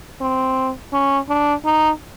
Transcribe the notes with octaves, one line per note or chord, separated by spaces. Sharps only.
C4
C#4
D4
D#4